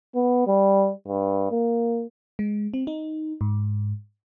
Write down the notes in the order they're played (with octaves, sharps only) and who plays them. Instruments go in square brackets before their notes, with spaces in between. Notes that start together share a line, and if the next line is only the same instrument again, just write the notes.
[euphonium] B3
G3
G2
A#3
[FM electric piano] G#3
C4
D#4
G#2